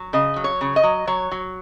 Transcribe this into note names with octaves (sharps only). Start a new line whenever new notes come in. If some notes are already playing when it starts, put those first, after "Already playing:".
Already playing: F#3
C#3 D#5
F#3
C#5
C#3
D#5
F#3
F#3 C#5
F#3